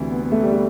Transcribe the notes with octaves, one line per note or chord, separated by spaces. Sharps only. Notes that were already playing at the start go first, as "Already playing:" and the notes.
Already playing: D2 C3 E3
B3
B3
A3
G3
A3